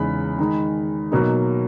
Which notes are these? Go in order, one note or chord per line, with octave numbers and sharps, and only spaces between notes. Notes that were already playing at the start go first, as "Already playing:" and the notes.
Already playing: E2 C#3 G#3 D#4 B5
D#3 G#3 D#4
B2 F#3 A#3 D#4